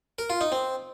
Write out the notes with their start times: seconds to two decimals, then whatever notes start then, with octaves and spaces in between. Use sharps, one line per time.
0.19 A#4
0.30 F4
0.41 D#4
0.52 C4